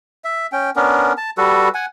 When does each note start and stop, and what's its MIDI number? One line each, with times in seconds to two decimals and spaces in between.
0.24 0.47 76
0.52 0.70 61
0.52 0.70 79
0.76 1.13 59
0.76 1.13 61
0.76 1.13 62
0.76 1.13 70
1.17 1.30 81
1.38 1.69 55
1.38 1.69 66
1.38 1.69 69
1.38 1.69 71
1.74 1.86 78
1.74 1.86 80